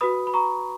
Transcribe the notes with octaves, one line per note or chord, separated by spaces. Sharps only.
F#4 B4 B5 D#6
B5
A#5 C#6